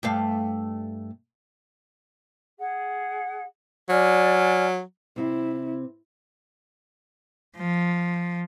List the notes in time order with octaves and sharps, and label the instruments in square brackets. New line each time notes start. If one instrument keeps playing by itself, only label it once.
[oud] G2 A3 F5
[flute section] G#4 F#5
[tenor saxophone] F#3 [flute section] D5 G#5 F6
[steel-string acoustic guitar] C3 C4 [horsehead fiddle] E4
[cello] F3